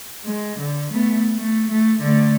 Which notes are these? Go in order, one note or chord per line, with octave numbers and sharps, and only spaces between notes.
G#3
D3
A3 B3
A3
A3
D3 A3